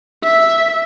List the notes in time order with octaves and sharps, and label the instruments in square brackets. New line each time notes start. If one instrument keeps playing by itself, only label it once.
[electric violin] E5